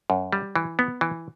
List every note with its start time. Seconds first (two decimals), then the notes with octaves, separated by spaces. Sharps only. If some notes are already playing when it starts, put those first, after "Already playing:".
0.10 F#2
0.32 G3
0.56 E3
0.79 B3
1.01 E3